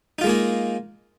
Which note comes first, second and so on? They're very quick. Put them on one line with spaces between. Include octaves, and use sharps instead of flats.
D#4 F4 G#3 A#3 G#4